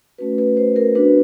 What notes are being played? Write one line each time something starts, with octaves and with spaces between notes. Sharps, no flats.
A3 C#4 F#4 B4
B4
C5
A#4
B3 D4 F#4 B4